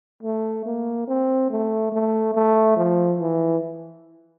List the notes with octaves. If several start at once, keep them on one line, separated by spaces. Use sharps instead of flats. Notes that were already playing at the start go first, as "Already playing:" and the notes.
A3
A#3
C4
A3
A3
A3
F3
E3